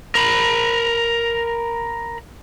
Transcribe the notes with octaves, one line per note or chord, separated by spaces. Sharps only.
A#4 B5